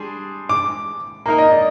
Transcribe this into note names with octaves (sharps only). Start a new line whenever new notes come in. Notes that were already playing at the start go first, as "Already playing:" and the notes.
Already playing: G3 D4 G#4 C6
D6
A#3 D#4 A#4 A#5
D#5
D5